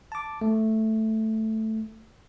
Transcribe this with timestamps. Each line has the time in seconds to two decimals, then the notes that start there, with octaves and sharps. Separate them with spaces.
0.12 A5 D6
0.41 A3